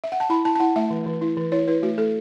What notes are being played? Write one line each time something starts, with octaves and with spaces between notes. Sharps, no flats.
E5
F#5
A5
E4 B5
E4 A5
A5
E4 F#5
A3 E5
E3
E3
E4
E3
E4 C#5
E4 B4
A3 F#4
A3 A4